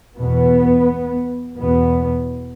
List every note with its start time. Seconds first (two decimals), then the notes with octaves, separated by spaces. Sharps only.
0.16 E2 B2 B3
1.58 E2 B2 B3